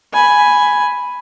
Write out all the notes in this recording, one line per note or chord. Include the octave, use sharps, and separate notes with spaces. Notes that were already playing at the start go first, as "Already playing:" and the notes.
G#5 B5